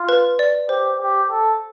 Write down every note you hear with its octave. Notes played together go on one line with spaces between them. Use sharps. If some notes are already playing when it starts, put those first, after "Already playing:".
Already playing: F4
B4
D5
G4 C5
G4
A4